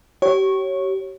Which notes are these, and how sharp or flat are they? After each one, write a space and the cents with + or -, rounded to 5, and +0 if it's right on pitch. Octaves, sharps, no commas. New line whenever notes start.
G4 -35 C#5 -10